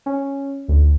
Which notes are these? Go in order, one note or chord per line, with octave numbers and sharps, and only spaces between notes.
C#4
D2